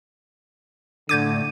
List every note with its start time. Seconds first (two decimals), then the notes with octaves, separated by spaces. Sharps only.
1.09 A2 D3 D4 D6 G6 G#6 D#7